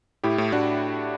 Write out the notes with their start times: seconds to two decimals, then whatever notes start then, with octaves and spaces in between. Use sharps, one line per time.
0.24 A2 E4 G4
0.38 A2
0.52 A2 D4 F#4